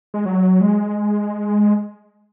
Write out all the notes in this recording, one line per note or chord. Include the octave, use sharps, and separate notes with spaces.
G#3
F#3
G#3